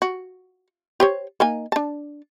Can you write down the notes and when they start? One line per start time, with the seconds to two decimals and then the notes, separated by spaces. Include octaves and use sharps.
0.02 F#4
1.00 G4 C5 C#5
1.40 A#3 D#4 G#5
1.72 D4 A5